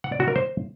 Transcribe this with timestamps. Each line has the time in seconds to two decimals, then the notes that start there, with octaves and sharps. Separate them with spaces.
0.04 F#5
0.12 D5
0.20 F#4
0.28 A#4
0.36 C5